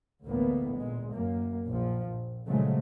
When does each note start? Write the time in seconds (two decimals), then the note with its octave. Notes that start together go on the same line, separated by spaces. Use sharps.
0.25 A1 D2 A2 A#3 B3
0.75 A#2 G#3
1.11 F#2 A#3
1.67 A#1 F3
2.08 A#1
2.49 A#2 C#3 F3 F#3 G#3 A3